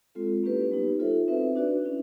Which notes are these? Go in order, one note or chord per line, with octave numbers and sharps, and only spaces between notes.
G#3 C4 F4 A4
A#3 C#4 E4 G4 B4
G3 B3 D#4 G4
F4 A4 C5 E5
C4 D#4 F#4 B4 E5
D4 F#4 B4 D5
C#4 E4